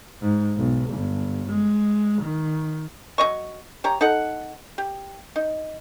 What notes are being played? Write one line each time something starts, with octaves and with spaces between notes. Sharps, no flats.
G#2
B1
G1
G#3
D#3
F#3 C#4 D#5 C#6
G4 C#5 A#5
D#4 A4 F#5
G4
D#4